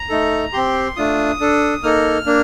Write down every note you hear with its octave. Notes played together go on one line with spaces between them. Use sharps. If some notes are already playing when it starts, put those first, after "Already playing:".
Already playing: A#5
A3 D#4 A4
C4 G4 C6
A3 D4 F4 D#6
D4 A4
A#3 D#4 A4 F6
A#3 D4